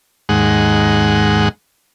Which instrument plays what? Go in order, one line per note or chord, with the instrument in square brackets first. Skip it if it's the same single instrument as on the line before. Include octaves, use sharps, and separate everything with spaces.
[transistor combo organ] D#2 G#2 G#3 F#5